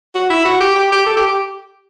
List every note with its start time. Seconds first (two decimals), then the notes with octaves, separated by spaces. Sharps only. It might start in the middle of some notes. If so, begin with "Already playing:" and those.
0.15 F#4
0.30 E4
0.45 F#4
0.61 G4
0.76 G4
0.92 G4
1.06 A4
1.17 G4
1.27 G4